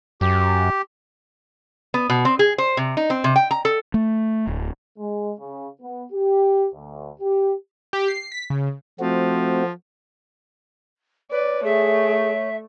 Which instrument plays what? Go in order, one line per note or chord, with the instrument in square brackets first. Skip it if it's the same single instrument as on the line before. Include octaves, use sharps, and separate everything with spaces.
[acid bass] F#2 [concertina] G4
[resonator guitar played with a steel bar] B3
B2
C4
G#4
C5
C3
D#4
C4
C3
G5
A#5
A4
[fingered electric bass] A3
D1
[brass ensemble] G#3
C#3
B3
G4
D2
G4
[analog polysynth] G4
C7
B6
C#3
[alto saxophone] F3 [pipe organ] A3 C4 F#4
[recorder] B4 [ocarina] C#5 [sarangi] D5
[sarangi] A3 [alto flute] G#4 [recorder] E5